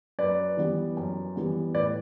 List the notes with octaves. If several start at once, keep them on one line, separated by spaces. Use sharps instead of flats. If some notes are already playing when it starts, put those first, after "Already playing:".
F#2 B4 D5
E3 G3 B3
F#2
E3 G3 B3
A2 B4 D5